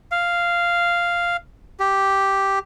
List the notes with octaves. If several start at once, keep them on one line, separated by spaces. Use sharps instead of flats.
F5
G4